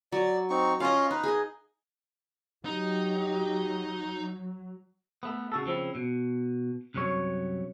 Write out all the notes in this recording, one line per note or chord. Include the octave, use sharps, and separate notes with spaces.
F#3 D5
C4 D#4 C#6
C#4 F4 D#5 F5
D#4 B4
G#4 D#5
F#3 D#4 G4
A3 B3
C#3 F#4 A4
C#3 F3 C4 E4
B2
C2 F#2 C3 F#3 C#5